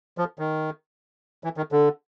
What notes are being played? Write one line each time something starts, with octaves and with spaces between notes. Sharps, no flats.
F3
D#3
E3
D#3
D3